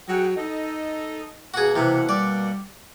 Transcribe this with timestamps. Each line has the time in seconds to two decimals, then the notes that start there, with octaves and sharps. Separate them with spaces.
0.08 F#3 G#4 F#5 G5
0.37 D#4 A4 D#5
1.54 B2 A#3 F#4 G#4 F#5
1.76 C3 E3
2.09 G3 D5